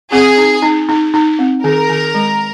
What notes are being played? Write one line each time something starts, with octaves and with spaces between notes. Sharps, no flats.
C4 G#4
D#4
D#4
D#4
D#4
C4
D#3 A#4
D#3
G#3